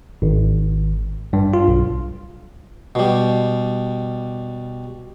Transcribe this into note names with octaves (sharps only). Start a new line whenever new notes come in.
G#1
G2
F4
B1
B2 G3